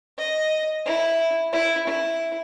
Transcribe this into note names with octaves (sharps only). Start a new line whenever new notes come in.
D#5
E4
E4
E4